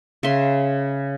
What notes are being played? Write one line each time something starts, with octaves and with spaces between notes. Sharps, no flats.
C#3 E5 C6